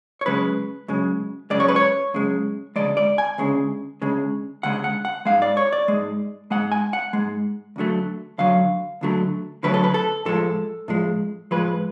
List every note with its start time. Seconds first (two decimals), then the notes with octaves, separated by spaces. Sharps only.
0.21 C#5
0.26 F#2 C#3 G#3 B4
0.88 F#2 C#3 G#3
1.50 F#2 C#3 G#3 D5
1.60 C#5
1.68 B4
1.76 C#5
2.14 F#2 C#3 G#3
2.76 D2 C#3 G#3 D5
2.97 D5
3.18 G#5
3.38 D2 C#3 G#3
4.02 D2 C#3 G#3
4.63 D2 C#3 G#3 F#5
4.84 F#5
5.05 F#5
5.25 G#2 G#3 F5
5.42 D5
5.57 C#5
5.72 D5
5.88 G#2 G#3
6.50 G#2 G#3 F#5
6.72 G#5
6.93 F#5
7.13 G#2 G#3
7.76 D2 D3 F#3 A3
8.38 D2 D3 F#3 F5
9.01 D2 D3 F#3 A3
9.63 D2 D3 F#3 A3 B4
9.74 A4
9.84 B4
9.94 A4
10.25 A2 F3 G#3 A4
10.88 A2 F3 G#3
11.51 A2 F3 G#3 B4